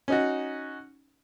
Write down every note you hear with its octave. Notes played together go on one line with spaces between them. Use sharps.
C#4 D#4 F#4